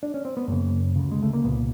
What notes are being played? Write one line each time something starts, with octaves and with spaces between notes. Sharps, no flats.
D4
C#4
C4
B3
F#2 C#3 A#3
D2 C#3
G#3
A3
A#3
C2 A#2 B3